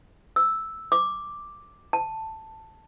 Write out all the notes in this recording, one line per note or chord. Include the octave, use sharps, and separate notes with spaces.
E6
D6
A5